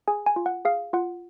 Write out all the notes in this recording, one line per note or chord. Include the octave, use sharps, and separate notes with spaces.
G#4 G#5
G#5
F4
F#5
G#4 F5
F4 F#5